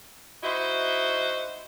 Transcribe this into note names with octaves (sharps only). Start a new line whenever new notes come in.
D#4 E4 F#4 C5 D#5 E5